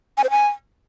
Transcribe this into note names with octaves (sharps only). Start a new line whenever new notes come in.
G#5
C5
G#5